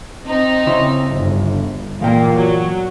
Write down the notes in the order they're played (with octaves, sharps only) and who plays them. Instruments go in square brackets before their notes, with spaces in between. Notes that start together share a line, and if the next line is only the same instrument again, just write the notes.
[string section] C4 D#4
[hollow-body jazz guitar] C#3 E4 C5
[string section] G1
[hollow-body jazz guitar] E2 F5 G5 [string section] A#2 A#3
[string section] F#3